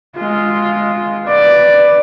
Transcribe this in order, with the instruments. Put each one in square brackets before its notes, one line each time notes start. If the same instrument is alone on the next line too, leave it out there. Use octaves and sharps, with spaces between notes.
[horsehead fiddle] G#3 F4
B4 D5